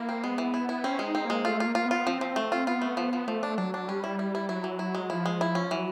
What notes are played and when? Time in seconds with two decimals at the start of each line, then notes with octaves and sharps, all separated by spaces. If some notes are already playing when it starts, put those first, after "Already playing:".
Already playing: A#3 E4
0.09 C4
0.24 G#3 B3
0.38 E3
0.54 E4
0.69 E4
0.84 C4 C#4
0.99 G#3
1.05 D#4
1.15 C4
1.25 G#3 A#3
1.45 A3 F4
1.60 F4
1.66 A#3
1.75 F4
1.86 B3
1.91 F4
2.06 F3 C4
2.21 F3
2.36 A3
2.52 F4
2.67 B3 F4
2.82 A3
2.97 F3
3.13 F3
3.28 F3 A3
3.43 D4
3.58 F#3 D4
3.74 D4
3.88 G3 C#4
4.04 E4
4.19 E4
4.35 E4
4.49 F#3 E4
4.64 E3
4.79 E4
4.95 G#3
5.10 F3 E4
5.26 G#3
5.41 E4
5.55 C#4
5.71 E3 F#3